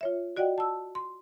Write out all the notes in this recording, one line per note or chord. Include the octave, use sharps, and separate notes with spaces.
F4 C#5 E5
F#4 D5 D#5 F#5 G5
A5 E6
C6